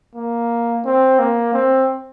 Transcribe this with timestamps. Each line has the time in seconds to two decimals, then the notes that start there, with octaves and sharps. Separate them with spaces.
0.15 A#3
0.85 C4
1.19 A#3
1.54 C4